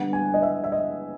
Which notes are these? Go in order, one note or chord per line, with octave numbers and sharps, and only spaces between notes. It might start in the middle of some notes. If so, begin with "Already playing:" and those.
Already playing: D3 G3 B3 F#5
G#5
D#5
E5
E5
D#5